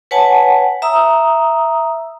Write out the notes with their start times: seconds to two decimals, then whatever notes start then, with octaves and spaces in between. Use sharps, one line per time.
0.11 B4 C#5 F#5 G#5 A5
0.82 E5 A#5 D#6 E6